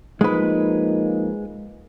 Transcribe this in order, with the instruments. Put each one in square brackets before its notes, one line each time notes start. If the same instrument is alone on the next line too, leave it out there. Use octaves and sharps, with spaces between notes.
[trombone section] F3 A#3 D#4 [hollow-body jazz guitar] G#3 B4